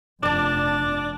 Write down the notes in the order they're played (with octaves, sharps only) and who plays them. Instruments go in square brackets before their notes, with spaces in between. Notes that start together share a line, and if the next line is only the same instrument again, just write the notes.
[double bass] F1 F2 [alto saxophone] D4 [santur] D5 A5